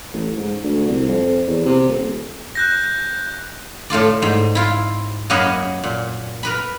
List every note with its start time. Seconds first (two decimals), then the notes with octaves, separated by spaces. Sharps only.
0.14 A1
0.38 G#2
0.63 D2
0.88 C2
1.09 F2
1.47 E2
1.66 C3
1.89 D#1
2.55 F#6 G6 A#6
3.90 A2 A3 F4 D5
4.22 G#2 C5
4.55 E4 F4
5.30 F#2 A#3 F#4 G#4 D#5 B5
5.84 A#2
6.43 A#4 B4 B5